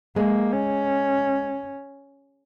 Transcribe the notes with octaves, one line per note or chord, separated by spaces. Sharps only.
G#3 A#3
C#4